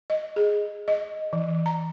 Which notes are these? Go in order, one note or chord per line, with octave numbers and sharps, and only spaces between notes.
D#5
G#4
D#5
E3
A#5